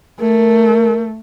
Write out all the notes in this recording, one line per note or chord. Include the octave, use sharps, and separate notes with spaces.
A3 A#4